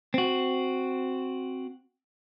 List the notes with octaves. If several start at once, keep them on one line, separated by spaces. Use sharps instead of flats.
C4 F#4